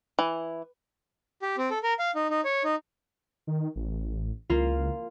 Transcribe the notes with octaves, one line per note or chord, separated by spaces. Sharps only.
E3
G4
C4
A4
A#4
F5
D#4
D#4
C#5
D#4
D#3
A1
C#2 A#3 F4